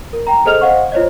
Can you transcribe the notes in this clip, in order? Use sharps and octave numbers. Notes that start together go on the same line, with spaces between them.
A#4
G5 A#5
G#4 A4 C5 D#5 F6 F7
C5 D#5 F5 F#5 C#6
F4 C5 C#5 D#5